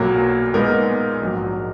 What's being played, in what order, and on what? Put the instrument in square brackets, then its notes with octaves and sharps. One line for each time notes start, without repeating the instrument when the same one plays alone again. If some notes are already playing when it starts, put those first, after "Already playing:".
Already playing: [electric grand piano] B1 A#2 F#3 A#3 A#4
A#2 G#3 B3 D#4 A#4
A#1 G#2 F#3